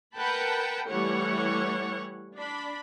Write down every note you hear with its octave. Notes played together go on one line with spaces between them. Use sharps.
A#4 B4 F#5 G5 A5 B5
E3 G3 A3 C#5 F#5
D4 B5